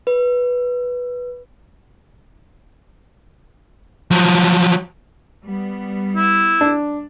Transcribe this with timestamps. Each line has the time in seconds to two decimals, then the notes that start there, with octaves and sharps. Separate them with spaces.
0.07 B4
4.11 F3 F#3
5.44 G3 B3
6.16 E4
6.61 D4